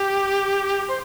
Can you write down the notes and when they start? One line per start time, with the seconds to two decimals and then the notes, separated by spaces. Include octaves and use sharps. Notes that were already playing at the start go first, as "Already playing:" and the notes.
Already playing: G4
0.88 C5